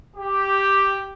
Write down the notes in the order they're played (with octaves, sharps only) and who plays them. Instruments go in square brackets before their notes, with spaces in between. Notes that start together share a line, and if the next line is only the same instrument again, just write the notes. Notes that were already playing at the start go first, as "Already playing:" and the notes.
[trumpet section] G4